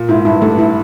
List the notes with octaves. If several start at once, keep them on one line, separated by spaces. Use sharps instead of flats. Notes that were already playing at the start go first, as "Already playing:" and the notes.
Already playing: A#2
G#2 E4
G2 E4
G2 A3
E4